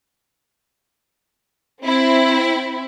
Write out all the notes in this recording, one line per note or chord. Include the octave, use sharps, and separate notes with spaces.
C4 E4